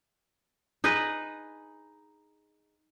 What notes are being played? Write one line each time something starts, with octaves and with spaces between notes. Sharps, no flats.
D#4 G#4 B4 D#5